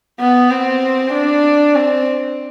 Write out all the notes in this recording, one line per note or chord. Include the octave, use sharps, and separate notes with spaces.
B3
C4
D4
C4